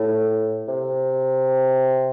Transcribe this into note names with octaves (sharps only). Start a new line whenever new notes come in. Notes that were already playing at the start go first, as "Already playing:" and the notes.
Already playing: A2
C3